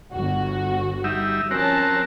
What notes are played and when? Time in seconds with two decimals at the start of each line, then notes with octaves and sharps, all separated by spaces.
0.13 G1 F#4
1.04 G3 D#4 E5
1.51 F3 C4 C#4 F#4 A#4 A5